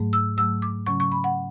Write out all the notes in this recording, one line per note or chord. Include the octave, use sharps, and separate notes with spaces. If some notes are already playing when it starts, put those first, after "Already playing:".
Already playing: G#2 F#3 A3
E6
G#2 F#3 A3 E6
D6
C#3 F#3 C#4 C#6
C#6
B5
F#5